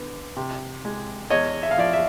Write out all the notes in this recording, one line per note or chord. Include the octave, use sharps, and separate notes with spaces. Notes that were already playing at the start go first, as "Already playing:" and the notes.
Already playing: D3 B3
C3
G#3
E2 C#5 D#5
E5
F5
F3 D5 E5
E5